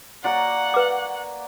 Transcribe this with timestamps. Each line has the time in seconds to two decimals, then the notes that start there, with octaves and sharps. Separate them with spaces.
0.24 A#3 F#4 D5 F#5
0.74 B4 D6